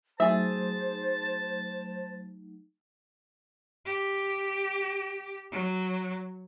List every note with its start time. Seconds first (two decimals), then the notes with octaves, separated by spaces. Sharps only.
0.20 F#3 A3 D#4 G#4 C5 E5 A5
3.85 G4
5.52 F#3